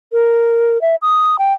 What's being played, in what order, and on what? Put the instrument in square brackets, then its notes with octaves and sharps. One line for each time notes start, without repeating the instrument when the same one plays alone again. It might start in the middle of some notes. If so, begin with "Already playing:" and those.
[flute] A#4
E5
D#6
G5